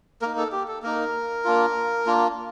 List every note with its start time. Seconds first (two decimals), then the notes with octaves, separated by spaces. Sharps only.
0.22 A#3 D#4 A#4
0.37 A4
0.52 G4
0.68 A4
0.83 A#3 D#4 A#4
1.44 A#3 D4 F4
2.06 A#3 D4 F4